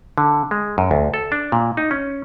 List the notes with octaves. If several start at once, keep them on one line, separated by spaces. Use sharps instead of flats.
D3
G#3
F#2
D2
A4
D4
A#2
D#4
C#4